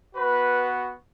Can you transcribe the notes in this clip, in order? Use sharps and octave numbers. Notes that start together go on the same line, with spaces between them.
B3 F#4 B4